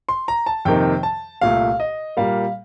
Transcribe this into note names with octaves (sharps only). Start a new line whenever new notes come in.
C6
A#5
A5
F2 C3 D#3 A#3 G5
A5
C2 A#2 A3 F5
D#5
A#2 G3 A#3 F5